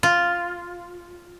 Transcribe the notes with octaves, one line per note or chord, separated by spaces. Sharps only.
F4